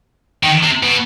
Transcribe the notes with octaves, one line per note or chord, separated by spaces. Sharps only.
D#3
C3
B2